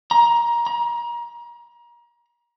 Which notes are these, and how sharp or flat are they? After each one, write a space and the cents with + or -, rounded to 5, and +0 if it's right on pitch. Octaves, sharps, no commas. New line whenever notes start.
A#5 +15
A#5 +30